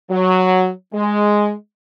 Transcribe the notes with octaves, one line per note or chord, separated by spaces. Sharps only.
F#3
G#3